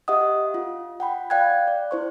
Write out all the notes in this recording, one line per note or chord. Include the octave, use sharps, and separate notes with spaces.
G4 D#5 E5 F#5 D#6
F4
F#5 G5 B5
D5 F5 G5 F#6 G#6
D5
E4 C5 C#6